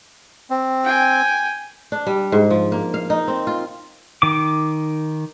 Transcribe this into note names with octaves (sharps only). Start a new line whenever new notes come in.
C4
G5 G#5
D4
G3
G#2
F3
A#3
F5
D#4
C4
F4
D#3 D6